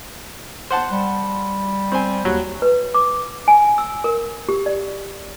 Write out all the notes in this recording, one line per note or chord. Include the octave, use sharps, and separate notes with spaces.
C5 F#5 A5
G3
C4 C5 G#5
D#2 F#3
B4
D6
G#5
E6
A#4
G4
D5